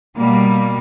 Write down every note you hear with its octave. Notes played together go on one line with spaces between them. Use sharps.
B2 G3 A#3